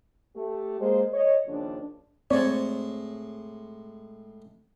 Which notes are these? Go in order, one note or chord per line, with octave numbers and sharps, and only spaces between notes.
A3 G4
G#3 A#3 C5
C#5 D#5
D#2 C#3 F3 D4
A2 G#3 C4 C#5 D5